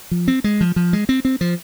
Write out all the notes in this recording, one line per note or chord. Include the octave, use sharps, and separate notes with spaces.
F3
C4
G#3
F3
F3
G#3
C4
C4
F3